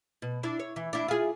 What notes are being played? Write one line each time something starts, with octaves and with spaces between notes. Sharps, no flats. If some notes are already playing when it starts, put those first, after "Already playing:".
B2
D4 E4
C#5
E3
D4 E4
F4 G#4